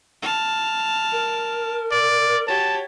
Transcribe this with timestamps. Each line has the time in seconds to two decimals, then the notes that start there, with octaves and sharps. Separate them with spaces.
0.23 A5 F6
1.12 A#4
1.92 D5
2.48 F#4 G4 C#5 A5